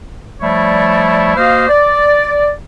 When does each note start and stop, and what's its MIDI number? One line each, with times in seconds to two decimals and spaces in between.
0.41 1.37 53
0.41 1.37 55
0.41 1.37 57
0.41 1.37 64
0.41 1.37 73
0.41 1.37 74
1.37 1.68 58
1.37 1.68 66
1.37 1.68 72
1.37 1.68 75
1.37 1.68 77
1.69 2.50 74